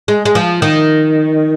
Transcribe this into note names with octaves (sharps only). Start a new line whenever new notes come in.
G#3
G#3
F3
D#3